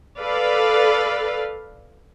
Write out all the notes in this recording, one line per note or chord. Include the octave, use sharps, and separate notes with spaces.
A4 B4 D5 F5